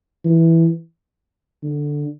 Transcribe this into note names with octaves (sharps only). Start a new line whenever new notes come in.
E3
D3